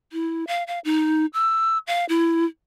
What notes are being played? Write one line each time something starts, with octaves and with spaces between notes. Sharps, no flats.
E4
F5
F5
D#4
E6
F5
E4